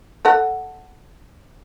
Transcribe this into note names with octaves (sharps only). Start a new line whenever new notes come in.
A4 D#5 F#5